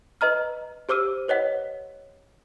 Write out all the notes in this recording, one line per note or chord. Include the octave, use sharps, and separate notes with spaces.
B4 D#5 A#5 F6
G4 C5 D6 E6 D#7
B4 C#5 D#5 F#5